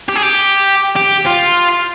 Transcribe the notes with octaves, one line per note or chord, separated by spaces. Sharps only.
G4
G#4
G4
G4
F4